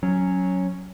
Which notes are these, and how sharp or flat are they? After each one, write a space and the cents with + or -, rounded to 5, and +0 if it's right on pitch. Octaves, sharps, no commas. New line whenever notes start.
F#3 +0 C#4 +0